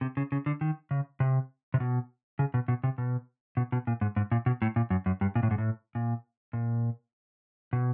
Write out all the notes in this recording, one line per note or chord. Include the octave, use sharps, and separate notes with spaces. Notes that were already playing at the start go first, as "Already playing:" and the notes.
C3
C#3
C#3
D3
D#3
C#3
C3
C3
B2
C#3
B2
B2
C3
B2
B2
B2
A#2
G#2
G#2
A#2
B2
A2
A#2
F#2
F#2
G2
A#2
A2
G#2
A2
A#2
A#2
B2